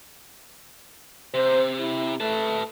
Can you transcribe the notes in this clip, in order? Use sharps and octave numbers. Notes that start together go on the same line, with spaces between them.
C3 C5
E4
A3 B4 A5